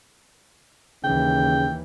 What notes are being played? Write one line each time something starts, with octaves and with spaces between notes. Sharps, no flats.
D#2 C#3 E3 G5